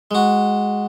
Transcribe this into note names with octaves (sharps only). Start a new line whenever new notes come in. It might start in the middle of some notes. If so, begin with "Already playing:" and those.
G#3 F#4